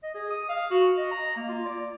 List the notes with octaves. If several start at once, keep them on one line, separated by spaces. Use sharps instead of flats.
D#5
G#4
D#6
F5
F#4
D#5
A#5
A#3
F4
D5